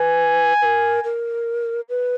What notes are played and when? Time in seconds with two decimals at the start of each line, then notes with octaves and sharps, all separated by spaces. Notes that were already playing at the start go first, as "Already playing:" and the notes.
Already playing: B4 G#5
0.62 B4
0.65 A#4
1.04 A#4
1.89 B4